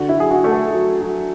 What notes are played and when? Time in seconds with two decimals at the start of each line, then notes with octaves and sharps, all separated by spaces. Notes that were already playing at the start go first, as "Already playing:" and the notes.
Already playing: D3 F#4
0.09 E4
0.17 F#3 G#4
0.31 F#4
0.44 A3
0.52 A4
0.73 F#3
1.01 F#3